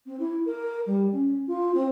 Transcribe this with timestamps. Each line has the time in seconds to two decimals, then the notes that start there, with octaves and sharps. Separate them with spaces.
0.06 C4
0.19 E4
0.46 A#4
0.86 G3
1.12 C#4
1.47 F4
1.74 C4